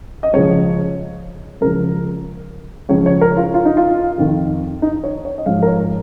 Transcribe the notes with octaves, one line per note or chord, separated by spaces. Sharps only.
D#5
C#2 C#3 F3 C#5
C#2 C#3 F3 A#4
C#2 C#3 F3 C#5
C#5
A#4
F4
F4
D#4
F4
F2 D#3
D#4
C#5
C#5
D#5
G#2 F3 F5
A#4
C#5